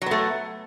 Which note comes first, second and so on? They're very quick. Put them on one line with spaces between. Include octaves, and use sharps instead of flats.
F#3 B3 A3